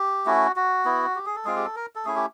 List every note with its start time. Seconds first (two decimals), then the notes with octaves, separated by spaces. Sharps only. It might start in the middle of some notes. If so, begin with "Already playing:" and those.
Already playing: G4
0.26 A3 C#4 E4 F#4
0.56 F#4
0.85 B3 E4
1.15 G4
1.26 G#4
1.35 A4
1.45 G#3 C4 F4 G#4
1.56 G4
1.65 A4
1.76 A#4
1.95 A4
2.05 A3 C#4 E4 G#4
2.16 G4